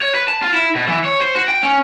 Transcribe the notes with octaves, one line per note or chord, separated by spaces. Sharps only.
C#5
B4
A5
F4
E4
B2
E3
C#5
C5
F#4
G5
C#4